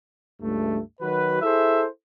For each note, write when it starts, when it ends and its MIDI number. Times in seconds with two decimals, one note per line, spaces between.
0.42 0.79 37
0.42 0.79 43
0.42 0.79 57
1.01 1.40 51
1.01 1.40 54
1.01 1.40 66
1.01 1.40 71
1.42 1.87 64
1.42 1.87 68
1.42 1.87 69
1.42 1.87 72
1.42 1.87 76